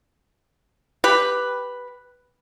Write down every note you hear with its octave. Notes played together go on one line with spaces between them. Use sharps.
G4 B4